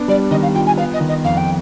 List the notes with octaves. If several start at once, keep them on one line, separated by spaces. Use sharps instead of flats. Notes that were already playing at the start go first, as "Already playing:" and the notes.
Already playing: B3 D4
G3 D5
D#3 D#5
F5
F4 G5
G#5
B3 F5
D#5
D#3
D#5
F2 F5
G5